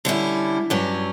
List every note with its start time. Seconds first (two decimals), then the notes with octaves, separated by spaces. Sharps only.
0.05 D3 G3 C#4 E4
0.70 G2 F#3 C#4